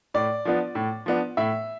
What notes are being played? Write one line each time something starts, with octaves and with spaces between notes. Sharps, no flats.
A2 D5
F3 B3 D4
A2
F3 B3 D4
A2 E5